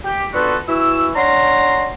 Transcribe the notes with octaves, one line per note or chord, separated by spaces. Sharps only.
G4
B3 D4 F4 F#4 A4 B4
E3 E4 F#4 E6
C#4 D4 F#5 A#5 C6